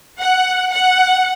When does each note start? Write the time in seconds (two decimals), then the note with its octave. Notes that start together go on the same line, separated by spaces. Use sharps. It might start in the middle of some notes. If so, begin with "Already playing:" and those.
0.19 F#5
0.74 F#5